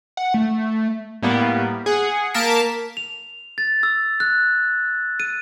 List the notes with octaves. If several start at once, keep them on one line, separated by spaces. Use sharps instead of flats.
F#5
A3
A2 G3 A#3 B3
G#4 F#5
A#3 A#4 F5 A5 B6 D7
F7
A6
E6
F#6
D#7